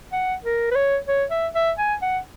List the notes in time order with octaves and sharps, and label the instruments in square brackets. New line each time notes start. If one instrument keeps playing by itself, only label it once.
[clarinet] F#5
A#4
B4
C#5
C#5
E5
E5
G#5
F#5